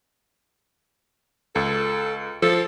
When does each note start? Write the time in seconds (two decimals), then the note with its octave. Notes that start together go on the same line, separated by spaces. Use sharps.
1.56 C#2 A4
2.42 F3 A4